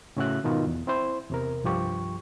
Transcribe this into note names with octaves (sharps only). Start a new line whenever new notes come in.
A2 C#3 C#4 F#4 E5 F#6
G#2 B2 D#3 D#4 F4
E2
C4 E4 C5
E2 C3 A#4
C2 G2 F3 G4 C#6